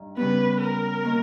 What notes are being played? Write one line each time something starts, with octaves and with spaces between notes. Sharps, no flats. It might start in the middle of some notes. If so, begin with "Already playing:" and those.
Already playing: G2 D#4
C#3 G3 B3 B4
A#4
D#3 A#3